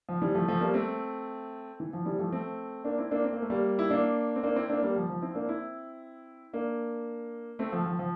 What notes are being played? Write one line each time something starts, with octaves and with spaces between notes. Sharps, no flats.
F3
E3 G3
F3 A3
F3 A3
G3 A#3
A3 C4
E3
F3
E3 G3
F3 A3
A3 C4
A#3 D4
C4 E4
A#3 D4
C4
A#3
A3
G3 A#3
E4
A#3 D4
C4
A#3 D4
C4 E4
A#3 D4
G3 A#3
F3
F3
C4 E4
A#3 D4
C4 E4
A#3 D4
A3 C4
F3 A3
F3
F3